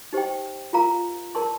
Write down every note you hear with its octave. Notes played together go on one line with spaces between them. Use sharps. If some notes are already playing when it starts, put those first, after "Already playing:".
D#4 G4 C5 D#5 G5
F4 A#4 F5 A#5
A#4 D5 A5 C6